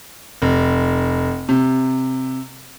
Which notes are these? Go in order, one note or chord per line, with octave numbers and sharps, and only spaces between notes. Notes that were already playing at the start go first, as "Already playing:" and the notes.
F1
C3